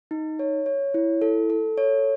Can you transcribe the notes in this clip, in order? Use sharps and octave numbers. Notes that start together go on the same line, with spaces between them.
D#4
C#5
C#5
E4
A4
A4
C#5